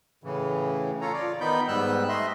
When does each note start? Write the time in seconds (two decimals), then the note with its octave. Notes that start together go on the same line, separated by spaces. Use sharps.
0.24 A2 C#3 E3
1.01 F4 A4 C#5 A#5
1.13 F4 D5
1.41 D#3 B3 D#4 B5 G6
1.68 G#2 G3 B3 E6 F#6
2.09 A3 D#5 E5 C6